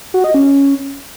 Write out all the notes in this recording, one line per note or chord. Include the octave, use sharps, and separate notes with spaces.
F#4
D#5
C#4